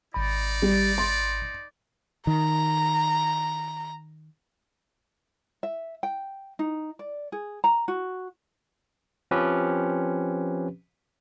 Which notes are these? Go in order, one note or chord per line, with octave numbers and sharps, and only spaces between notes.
G#1 D#4 D5 B5
G3
C6
D#3 A#5
E5
G5
D#4
D5
G#4
A#5
F#4
F3 C4 C#4 G4 B4